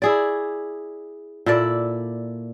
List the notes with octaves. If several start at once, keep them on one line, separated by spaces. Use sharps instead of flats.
E4 G#4 D5
A#2 E4 A4 D5